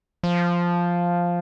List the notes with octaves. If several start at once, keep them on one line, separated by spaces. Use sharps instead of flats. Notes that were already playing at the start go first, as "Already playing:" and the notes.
F3